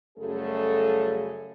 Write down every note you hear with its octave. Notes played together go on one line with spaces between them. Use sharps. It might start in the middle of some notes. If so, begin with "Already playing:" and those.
F#2 C#3 G3 A3 G#4 A4